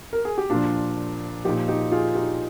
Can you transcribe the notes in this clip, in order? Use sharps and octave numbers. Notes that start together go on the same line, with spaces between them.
A#4
G#4
G4
A#2 F3 D4 F4
A#2 F3 D#4 G4
D#4 G4
F4 G#4
D#4 G4